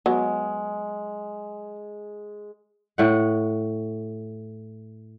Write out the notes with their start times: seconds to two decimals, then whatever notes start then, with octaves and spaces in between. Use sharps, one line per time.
0.06 F#3 G#3 B3
2.98 A2 F#5